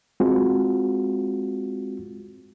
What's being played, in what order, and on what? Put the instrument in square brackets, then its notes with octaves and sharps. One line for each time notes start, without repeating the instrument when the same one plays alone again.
[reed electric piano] G#3 C4 F4 F#4